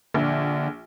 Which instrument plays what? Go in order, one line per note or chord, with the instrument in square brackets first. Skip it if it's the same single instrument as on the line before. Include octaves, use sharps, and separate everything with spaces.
[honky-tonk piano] A#1 [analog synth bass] D3